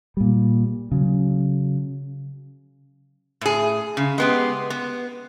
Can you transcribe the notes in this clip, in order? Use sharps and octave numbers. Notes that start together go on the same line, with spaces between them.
A#2 G3
C#3 F#3
A2 G#4
C#3
G#3 B3 G4
B3